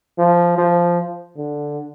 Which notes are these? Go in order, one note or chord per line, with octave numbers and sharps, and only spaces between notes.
F3
F3
D3